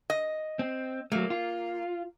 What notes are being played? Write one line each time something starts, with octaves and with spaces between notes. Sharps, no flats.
D#5
C4
F#3 A3 A#3
F4